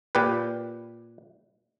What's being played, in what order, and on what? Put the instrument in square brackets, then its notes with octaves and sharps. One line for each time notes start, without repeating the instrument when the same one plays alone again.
[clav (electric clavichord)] A#2 G4 B4